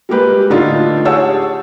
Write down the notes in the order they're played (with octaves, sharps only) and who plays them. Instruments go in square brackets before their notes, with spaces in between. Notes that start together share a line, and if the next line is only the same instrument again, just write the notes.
[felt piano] G3 G#3 A#3 G4 B4
A2 D3 D4 D#4 F4
G4 G#4 C#5 F#5 A5 E6